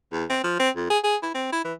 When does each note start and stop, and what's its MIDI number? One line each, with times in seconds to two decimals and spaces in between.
0.12 0.24 40
0.30 0.40 60
0.43 0.58 53
0.59 0.69 60
0.76 0.90 41
0.90 0.98 68
1.04 1.16 68
1.23 1.33 64
1.34 1.50 60
1.52 1.60 64
1.65 1.73 52